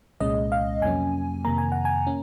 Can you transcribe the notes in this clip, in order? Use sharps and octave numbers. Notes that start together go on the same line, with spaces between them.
C2 A#2 G#3 C#4 D#5
F5
F2 C3 F#3 A#3 C#4 G#5
F2 C3 D#3 A#3 A#5
G#5
F#5
G#5
A#3 C#4